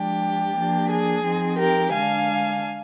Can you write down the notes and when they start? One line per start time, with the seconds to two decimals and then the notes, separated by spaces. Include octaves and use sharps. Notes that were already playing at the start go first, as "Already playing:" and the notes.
Already playing: F3 G#3 D4 G4
0.56 F3 A#3 D4
0.90 G#4
1.24 F3 C4 D#4
1.58 G4 A#4
1.93 D3 G#3 D4 F5 G#5